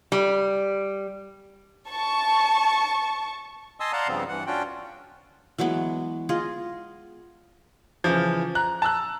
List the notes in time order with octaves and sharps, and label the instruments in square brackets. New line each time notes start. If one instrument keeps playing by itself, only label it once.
[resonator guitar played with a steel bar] G3
[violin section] A5 C#6
[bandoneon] D#5 G#5 A5 C6 D#6 E6
D5 F5 F#5 A5 A#5 C6
G2 C#3 F3 B3 C4
G2 E3 F#5
C#4 D4 F4 F#4 G5
[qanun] E3 F#3 G#3 B3
F4 G#4 D#5
[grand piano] C#3 E3 F3
A#5 F#6
A5 A#5 E6 F#6